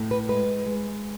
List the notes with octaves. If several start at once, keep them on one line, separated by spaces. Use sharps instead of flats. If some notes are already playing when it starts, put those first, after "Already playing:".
Already playing: A2
B4
G#3 B4
G#3